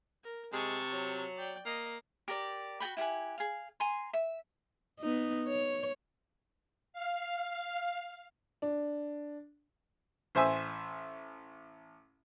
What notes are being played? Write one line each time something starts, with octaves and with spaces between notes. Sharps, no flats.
A#4
C3 G#3 A5 C#6
F#3
D5 G5
A#3 D#5
G4 A#4 D5
F#4 A4 G5 B5
E4 G4 F#5 G#5
G#4 F5
G#5 A#5 C6
E5
B3 D#4
C#5
F5
D4
A1 C5 E5 G#5 E6